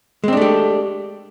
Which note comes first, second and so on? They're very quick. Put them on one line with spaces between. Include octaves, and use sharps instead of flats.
G#3 C4 D4 A3 G4